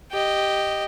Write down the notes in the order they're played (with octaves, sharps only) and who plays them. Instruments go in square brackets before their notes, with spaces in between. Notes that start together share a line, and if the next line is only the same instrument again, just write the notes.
[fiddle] G4 D#5